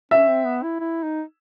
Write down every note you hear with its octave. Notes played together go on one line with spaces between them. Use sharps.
C#4 E5
C4
B3
E4
E4
D#4